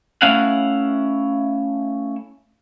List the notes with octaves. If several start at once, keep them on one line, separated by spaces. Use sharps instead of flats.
A3 C#4 E4 F5 F#5